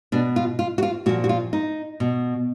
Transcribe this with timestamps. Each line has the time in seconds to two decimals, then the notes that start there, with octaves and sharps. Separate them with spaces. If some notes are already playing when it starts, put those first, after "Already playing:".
0.12 B2 D4
0.36 F4
0.59 F4
0.78 F#4
0.83 F4
1.06 A#2 F#4
1.09 F3
1.24 F#4
1.29 F4
1.53 D#4
2.00 B2